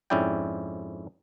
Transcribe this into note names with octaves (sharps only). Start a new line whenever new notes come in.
F2 G#2 C#4 E4 D5 G5